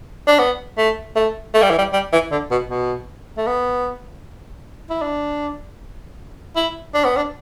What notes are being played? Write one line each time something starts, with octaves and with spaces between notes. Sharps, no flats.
D4
B3
A3
A3
A3
G3
E3
G3
G3
E3
D3
B2
B2
A3
B3
E4
D4
E4
D4
B3
D4